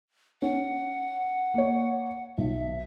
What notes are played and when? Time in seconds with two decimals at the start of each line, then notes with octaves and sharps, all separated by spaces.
0.42 C#4 F#5
1.54 A#3 C#5
2.38 B1 E5